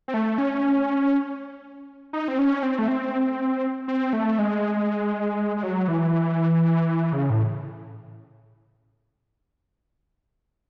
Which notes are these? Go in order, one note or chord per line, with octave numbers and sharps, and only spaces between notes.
C4
A3
C#4
D#4
C4
C#4
C4
A3
C4
C4
A3
G#3
G#3
F#3
E3
C#3
A2